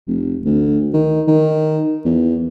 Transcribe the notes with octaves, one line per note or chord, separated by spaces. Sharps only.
F1
D2
D#3
D#3
E2